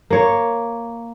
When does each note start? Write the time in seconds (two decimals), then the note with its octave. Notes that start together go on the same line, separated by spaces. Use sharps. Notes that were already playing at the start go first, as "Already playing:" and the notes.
0.10 A#3 C#5